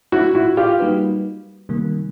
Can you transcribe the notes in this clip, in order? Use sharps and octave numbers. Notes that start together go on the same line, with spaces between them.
E4 F#4
E4 F#4
F4 G4
G3 A#3 D#4 F#4 B4
C3 D#3 G3 A#3